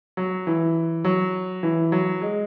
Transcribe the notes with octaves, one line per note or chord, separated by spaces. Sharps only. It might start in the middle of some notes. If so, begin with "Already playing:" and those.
F#3
E3
F#3
E3
F#3
G#3